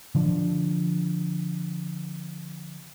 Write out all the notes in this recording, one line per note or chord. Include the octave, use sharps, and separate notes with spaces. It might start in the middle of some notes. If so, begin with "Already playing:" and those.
D3 F3 D4